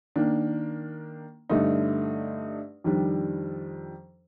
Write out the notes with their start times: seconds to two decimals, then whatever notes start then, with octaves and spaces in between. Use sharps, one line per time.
0.16 D#3 A#3 D4
1.49 G2 D3 A3 D#4
2.84 F2 D#3 G3 D4